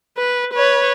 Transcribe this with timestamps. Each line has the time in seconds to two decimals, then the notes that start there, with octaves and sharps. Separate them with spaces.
0.18 B4
0.54 B4 C#5